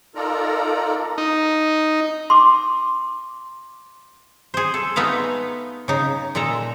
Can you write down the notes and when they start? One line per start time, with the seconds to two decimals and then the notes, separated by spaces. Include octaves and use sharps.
0.15 D#4 F4 A4 A#4 D5 A#5
1.18 D#4
2.30 C6 D6
4.54 G#4 C5
4.74 A4
4.96 G#3 A3 B3 D#4 B4 F5
5.88 C#3 D#4
6.35 A#2 G#3 A4 A#5